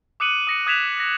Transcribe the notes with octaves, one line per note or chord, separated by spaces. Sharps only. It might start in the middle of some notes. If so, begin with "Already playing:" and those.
D6 D#6 F#6 C#7 D#7 F#7
D#6 A#6 C#7
D#6 F#6 G#6 B6 E7 F7
A#6